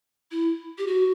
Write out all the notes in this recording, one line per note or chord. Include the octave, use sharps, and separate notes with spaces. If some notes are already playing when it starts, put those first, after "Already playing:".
E4
G4
F#4